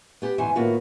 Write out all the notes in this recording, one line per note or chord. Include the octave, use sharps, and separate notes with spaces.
B3 G4
D2 G#2 E3 B3 C5 G#5
A2 D#3 A#3 B3 F4 F#4